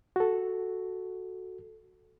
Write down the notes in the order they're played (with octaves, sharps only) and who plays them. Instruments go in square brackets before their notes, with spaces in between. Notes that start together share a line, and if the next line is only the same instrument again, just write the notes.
[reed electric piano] F#4 A4